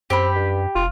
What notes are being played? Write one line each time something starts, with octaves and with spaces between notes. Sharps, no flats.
F#2 C4 G4 B5
G2
F1 F4